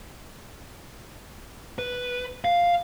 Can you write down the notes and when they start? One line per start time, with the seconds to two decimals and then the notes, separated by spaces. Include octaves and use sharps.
1.79 B4
2.45 F5